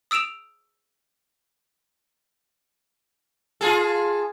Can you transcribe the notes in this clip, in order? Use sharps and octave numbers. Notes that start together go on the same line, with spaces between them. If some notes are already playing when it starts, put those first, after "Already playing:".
D#6 E6 D7 E7 F7
F4 G#4 A4